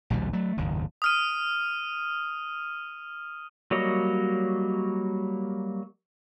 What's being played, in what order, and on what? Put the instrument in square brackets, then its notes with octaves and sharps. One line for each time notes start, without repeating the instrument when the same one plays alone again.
[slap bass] A#1 D#2 B2 G3
F#3 A3
F#1 D#2 G#2
[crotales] D#6 F6 D#7
[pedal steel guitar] F#3 G3 A#3 C#5 D#5